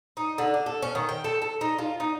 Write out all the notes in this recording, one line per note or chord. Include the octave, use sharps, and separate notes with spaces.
D#4
D3
D4
A4
C#4
D#3
G5
A4
A4
D#4
F4
D#4